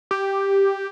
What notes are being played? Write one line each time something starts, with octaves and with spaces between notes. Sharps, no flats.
G4